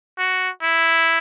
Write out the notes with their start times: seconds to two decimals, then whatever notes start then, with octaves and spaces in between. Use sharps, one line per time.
0.18 F#4
0.63 E4